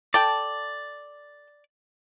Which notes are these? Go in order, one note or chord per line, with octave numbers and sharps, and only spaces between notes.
A4 D5 G5 A5